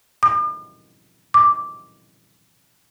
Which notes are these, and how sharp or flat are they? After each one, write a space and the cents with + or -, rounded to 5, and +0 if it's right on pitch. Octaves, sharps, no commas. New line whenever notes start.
D6 +45
D6 -5